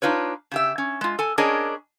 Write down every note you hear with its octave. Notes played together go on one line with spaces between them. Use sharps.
D4 D#4 F4 B4 C#5
C#3 G4 E5
C#4
G#3 F4
A4 G#5
C#4 D4 G#4 A#4 C#5 D#5